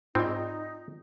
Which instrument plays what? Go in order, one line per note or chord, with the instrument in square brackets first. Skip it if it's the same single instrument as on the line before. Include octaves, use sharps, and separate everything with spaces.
[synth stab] G#2 [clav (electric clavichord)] C4 [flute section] D#4 [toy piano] F4 D5